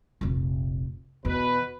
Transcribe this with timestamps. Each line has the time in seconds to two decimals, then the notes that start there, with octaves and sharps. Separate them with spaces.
0.21 F1 A#1
1.25 E2 B2 B4